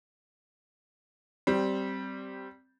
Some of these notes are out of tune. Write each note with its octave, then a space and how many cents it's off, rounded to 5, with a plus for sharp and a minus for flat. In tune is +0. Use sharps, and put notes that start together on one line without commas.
G3 -10 C4 +0